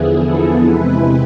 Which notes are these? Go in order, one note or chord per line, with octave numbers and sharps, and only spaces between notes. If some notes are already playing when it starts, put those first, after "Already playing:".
Already playing: E2 D3 F3 B3 E4 G#4
A4
E2 C3 G#3 C4 E4 B4